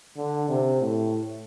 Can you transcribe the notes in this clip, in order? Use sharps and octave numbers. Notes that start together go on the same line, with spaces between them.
D3
C3
A2